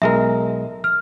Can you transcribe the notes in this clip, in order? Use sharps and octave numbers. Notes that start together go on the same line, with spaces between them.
B1 G#3 A#4 E5
F6